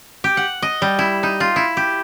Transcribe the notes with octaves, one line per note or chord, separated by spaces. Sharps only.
G4
F#5
D#5
G3
E4
D#4
F4
E4
G4